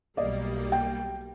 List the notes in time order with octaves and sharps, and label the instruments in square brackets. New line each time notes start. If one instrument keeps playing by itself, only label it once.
[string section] B1 G3 A#3 [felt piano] D5 D#5
[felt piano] G5